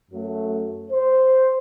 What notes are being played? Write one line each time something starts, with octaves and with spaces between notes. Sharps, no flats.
F#2 F#3 A3
C5